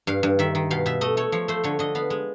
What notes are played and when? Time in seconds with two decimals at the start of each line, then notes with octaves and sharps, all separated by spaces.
0.07 G2 F5
0.23 G2
0.39 D#3 E5
0.55 D#3
0.71 B2 F5
0.86 B2 E5
1.01 A3 D#5
1.17 A3 C#5
1.32 F3 C#5
1.48 A3 C5
1.64 D3 C#5
1.79 D3 D#5
1.95 B3 F5
2.10 G#3